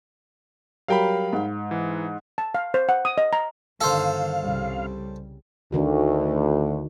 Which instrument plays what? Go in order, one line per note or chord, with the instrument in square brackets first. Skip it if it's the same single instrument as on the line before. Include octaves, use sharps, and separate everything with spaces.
[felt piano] F#3 G3 A#4 [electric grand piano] F5 G5 B5
[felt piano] G#2
[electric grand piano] E3
[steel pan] A5
F5
C5
F#5
D#6
D#5
A#5
[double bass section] G1 D3 D#3 [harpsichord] A4 C5 [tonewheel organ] F5
[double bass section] C2 C#3 G3
[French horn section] D2 [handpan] D3 D#3 F#4